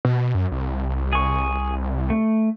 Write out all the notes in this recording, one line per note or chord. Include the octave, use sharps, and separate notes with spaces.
B2
F#2
C2
G#4 C#6
A3